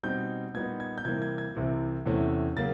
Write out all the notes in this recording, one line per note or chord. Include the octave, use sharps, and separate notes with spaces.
B2 G3 C4 D#4 G6
A#2 G3 B3 D#4 G#6
G#6
G6
C3 E3 G3 A#3 G#6
G#6
G#6
C2 C3 E3
E2 C3 E3 A3 C#4
C#3 F#3 A#3 A6